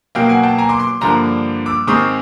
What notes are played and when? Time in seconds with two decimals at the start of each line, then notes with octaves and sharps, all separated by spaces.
0.15 B2 F#3 A#3 F5 G5
0.29 F#5 G#5
0.43 G5 A5
0.58 G#5 A#5
0.69 C6 D6
0.80 C6 D6
1.01 G2 D3 F3 A#3 A#5 C6
1.66 D6 E6
1.87 G#2 D#3 G#3 C4 C#6 D#6